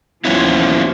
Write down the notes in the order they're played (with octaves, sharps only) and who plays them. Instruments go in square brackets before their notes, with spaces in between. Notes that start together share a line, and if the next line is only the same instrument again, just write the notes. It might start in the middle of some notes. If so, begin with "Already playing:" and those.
[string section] D#2 F3 [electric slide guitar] B3 C#4 E4